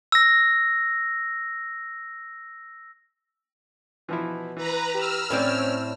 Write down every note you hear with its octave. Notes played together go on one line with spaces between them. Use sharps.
E6 A#6
B2 E3 F3 E4
E3 B4 A#5
G4 E6 F6
A2 C4 C#4 D5